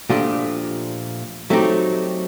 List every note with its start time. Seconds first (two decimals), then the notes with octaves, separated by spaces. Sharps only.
0.10 A#2 F3 A3 D4 G4
1.50 F#3 A3 C4 D#4 G4